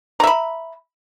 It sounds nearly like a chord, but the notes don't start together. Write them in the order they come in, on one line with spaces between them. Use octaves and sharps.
A#5 E5 B5